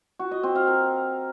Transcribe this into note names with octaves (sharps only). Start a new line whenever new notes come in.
F#4
D#5
C4
F5
A#4